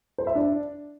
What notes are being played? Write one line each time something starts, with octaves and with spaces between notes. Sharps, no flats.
C5
E5
D4